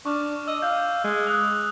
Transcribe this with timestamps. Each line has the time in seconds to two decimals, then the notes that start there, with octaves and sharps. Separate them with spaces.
0.06 D4 C#6 D6 F6
0.48 D#5 E6
0.62 F5 G6
1.04 G#3
1.27 D#6 F#6